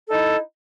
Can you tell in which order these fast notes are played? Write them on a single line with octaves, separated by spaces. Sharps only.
A4 D#4 E4